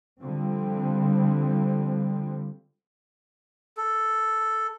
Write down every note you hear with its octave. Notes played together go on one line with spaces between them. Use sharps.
D3 F3 G3 C4
A4